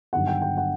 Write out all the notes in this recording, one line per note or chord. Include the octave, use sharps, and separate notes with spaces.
G1 G2 D#3 F#3 F#5
G5
G5
F#5